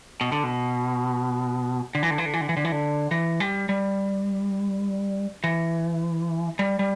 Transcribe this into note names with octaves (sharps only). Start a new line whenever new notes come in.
B2
D3
B2
D3
E3
D3
E3
D3
E3
D3
E3
D3
E3
D3
E3
G3
G3
E3
G3
G3